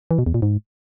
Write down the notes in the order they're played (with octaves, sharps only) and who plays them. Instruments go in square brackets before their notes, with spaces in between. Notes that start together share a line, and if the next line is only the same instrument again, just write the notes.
[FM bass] E3
B2
E2
A#2
G#2